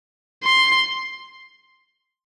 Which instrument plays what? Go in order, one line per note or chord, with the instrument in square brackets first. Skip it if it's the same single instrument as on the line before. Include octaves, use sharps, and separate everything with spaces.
[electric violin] C6